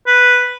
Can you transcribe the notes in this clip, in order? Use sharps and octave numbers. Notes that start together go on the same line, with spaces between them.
B4